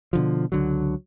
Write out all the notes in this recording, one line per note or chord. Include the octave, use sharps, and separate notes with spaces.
B2 D3 F3
C#2 D3 F#3